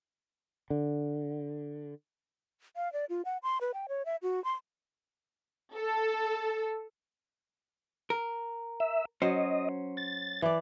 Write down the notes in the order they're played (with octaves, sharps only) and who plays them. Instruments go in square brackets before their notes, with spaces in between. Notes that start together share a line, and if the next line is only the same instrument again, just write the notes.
[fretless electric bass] D3
[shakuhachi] F5
D5
F4
F#5
C6
B4
G5
C#5
E5
F#4
C6
[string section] A4
[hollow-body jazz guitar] A#4
[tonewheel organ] E5
[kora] F#3 [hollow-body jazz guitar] C#4 C5 [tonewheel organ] D#5
[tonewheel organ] A6
[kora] E3 D5